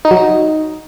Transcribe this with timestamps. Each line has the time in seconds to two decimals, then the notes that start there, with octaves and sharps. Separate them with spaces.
0.05 D#4
0.11 F#3
0.17 D#4